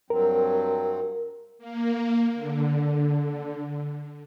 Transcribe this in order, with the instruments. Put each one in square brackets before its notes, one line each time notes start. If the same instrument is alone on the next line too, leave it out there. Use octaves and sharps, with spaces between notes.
[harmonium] G2 F#3 C4 [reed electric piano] A#4
[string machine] A#3
D3